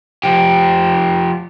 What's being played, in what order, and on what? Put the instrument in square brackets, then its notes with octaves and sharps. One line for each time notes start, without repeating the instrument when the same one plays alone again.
[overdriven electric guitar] F3 G4